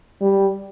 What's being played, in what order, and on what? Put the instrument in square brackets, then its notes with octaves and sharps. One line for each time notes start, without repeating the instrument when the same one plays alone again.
[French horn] G3